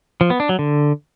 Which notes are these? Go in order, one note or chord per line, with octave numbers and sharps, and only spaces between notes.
F3
B3
D4
F#3
D3